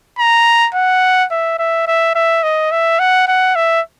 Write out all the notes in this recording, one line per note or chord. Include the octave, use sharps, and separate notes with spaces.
A#5
F#5
E5
E5
E5
E5
D#5
E5
F#5
F#5
E5